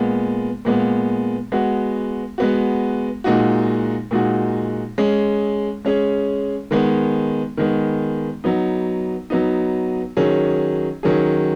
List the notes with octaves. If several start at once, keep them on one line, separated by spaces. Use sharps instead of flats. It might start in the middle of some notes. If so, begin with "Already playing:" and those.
Already playing: A#2 G#3 B3
A#2 G#3 B3
G#3 B3 F#4
G#3 B3 F#4
A#2 G#3 D#4 F#4
A#2 G#3 D#4 F#4
G#3 C#4 G#4
G#3 C#4 G#4
D#3 G#3 B3
D#3 G#3 B3
F#3 B3 D#4
F#3 B3 D#4
D#3 F#3 C#4 G#4
D#3 F#3 C#4 G#4